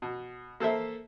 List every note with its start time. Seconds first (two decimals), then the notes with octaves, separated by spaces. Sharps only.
0.02 B2
0.60 A#3 A4 C5 E5